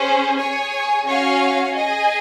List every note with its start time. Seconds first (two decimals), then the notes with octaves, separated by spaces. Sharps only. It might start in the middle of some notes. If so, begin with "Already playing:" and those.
Already playing: C#4 G#4 C5
0.37 G#4 C#5 G#5
1.05 C#4 F#4 C#5 F5 G#5
1.73 G#4 D#5 G#5